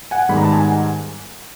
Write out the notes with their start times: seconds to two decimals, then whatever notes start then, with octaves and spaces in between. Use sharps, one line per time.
0.11 F#5 G#5
0.29 G#2 D#3 G3 B3 B5
0.37 A#5
0.45 A5
0.52 G#5 A#5
0.64 F#5 G#5